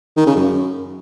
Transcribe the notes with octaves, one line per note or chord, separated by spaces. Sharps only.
D#3
C#3
F#2